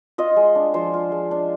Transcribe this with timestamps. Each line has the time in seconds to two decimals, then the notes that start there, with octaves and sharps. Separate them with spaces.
0.18 F4 D#5
0.36 G#3
0.55 D4
0.74 F3 C5
0.94 F4
1.12 G#3
1.31 D4